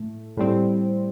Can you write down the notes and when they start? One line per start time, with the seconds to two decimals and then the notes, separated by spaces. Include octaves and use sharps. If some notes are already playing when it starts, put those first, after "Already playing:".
Already playing: A2 A3
0.37 A2 G3 C4